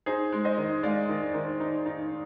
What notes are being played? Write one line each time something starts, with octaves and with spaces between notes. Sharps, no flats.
D#4 G#4 C5
G#3
C5 D#5
D#3
G#3 D5 F5
D#3
D#3
D#4
D#4